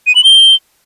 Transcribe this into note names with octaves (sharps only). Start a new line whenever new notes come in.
D#7
F#7
G7